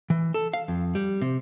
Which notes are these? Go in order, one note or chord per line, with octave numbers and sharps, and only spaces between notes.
E3
A4
F5
F2
G3
C3